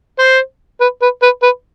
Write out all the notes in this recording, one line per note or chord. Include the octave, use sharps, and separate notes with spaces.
C5
B4
B4
B4
B4